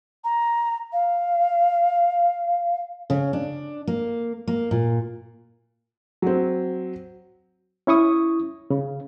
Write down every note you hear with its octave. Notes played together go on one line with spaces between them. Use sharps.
A#5
F5
C#3
D4
A#3
A#3
A#2
F#3 C4
C#4 E4 C#6 D#6
C#3